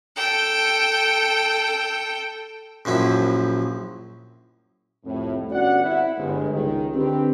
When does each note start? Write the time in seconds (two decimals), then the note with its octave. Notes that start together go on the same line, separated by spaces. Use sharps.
0.16 A4 G5
2.85 A#1 F#2 F3 E4
5.04 C2 F2 A2
5.50 G1 C#4 F#4 D5 F#5
5.83 C4 E4
6.18 G1 G#3
6.52 C#2 D#3
6.94 D3 C4 G4 B4